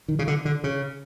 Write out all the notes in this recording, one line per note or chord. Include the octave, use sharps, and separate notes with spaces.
D#3
C#3
D3
D3
C#3